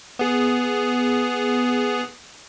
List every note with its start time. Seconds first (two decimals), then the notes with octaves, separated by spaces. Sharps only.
0.19 B3 G#4